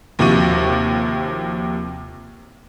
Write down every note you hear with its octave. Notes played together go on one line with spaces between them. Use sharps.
D#2 C3 F3 F#4 D#7